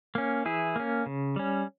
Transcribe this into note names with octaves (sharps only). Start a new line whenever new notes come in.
A#3 C#4
E3 E4 G#4
A#3 C#4
C#3
G3 C#4